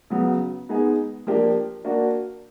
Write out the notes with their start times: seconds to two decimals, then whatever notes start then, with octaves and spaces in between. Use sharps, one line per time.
0.10 C#3 F#3 B3
0.69 G#3 B3 D#4 G#4
1.27 F3 A#3 D4 G4
1.85 A#3 D4 F#4